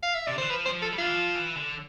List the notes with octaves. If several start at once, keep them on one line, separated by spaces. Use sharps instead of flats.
F5
E5
C3 D5
D3
E3 C5
F3 B4
G3 C5
F3
A4
G3
D3 F4
E3
F3
E3
D3